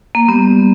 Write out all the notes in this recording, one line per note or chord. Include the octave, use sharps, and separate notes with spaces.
A#3
G3 B3